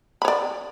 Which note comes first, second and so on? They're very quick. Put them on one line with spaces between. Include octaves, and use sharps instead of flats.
B5 C#5 D5